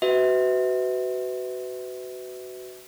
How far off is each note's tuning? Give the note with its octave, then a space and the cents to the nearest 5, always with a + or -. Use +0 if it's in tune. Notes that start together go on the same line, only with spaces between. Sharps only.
F#4 +20 B4 +25 E5 -35